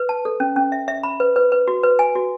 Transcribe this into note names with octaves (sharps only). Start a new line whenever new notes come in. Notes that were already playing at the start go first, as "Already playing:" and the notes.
Already playing: B4
A5
A4
C#4
C#4
E5
E5
B5
B4
B4
B4
F#4
B4
G#5
F#4